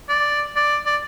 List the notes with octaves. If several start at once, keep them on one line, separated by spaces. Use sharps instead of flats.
D5
D5
D5